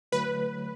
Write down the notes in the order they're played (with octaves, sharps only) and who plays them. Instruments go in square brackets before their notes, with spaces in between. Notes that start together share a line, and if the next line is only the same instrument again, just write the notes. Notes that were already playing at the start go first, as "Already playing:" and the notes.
[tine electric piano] D3 F#3 A3 [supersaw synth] B4